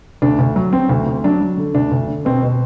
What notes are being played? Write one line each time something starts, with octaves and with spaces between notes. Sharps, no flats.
D2 D4
D2
F#3
F#3 C4
D2
D2
F#3 D4
F#3
D3
D2 D4
D2
D3
B2 C4
B2